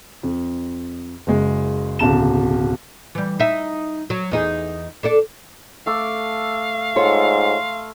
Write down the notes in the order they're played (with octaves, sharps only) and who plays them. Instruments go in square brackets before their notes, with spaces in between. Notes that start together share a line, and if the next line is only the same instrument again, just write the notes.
[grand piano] F2
F#1 G#3
D1 B1 C#3 A5 E7
[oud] E3 G3
D#4 E5
F#3
E2 D#4 G#4
D4 A4 D5
[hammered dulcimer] A3 A4 D6 [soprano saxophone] F5
[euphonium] G#2 [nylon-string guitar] F4 A4 C#5 [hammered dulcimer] C6